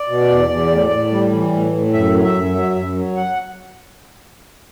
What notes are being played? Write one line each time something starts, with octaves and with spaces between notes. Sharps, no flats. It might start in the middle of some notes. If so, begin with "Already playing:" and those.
Already playing: D5
B2
E2
E2
A2
A2
G3
E3
A2
A2
F#2 E5
F#3
E5
F#2
F#3
F#2
F#3
F#5